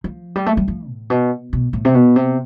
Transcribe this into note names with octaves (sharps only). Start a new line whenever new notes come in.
F3
G3
A3
G3
F3
A2
B2
B2
A2
C3
B2
C3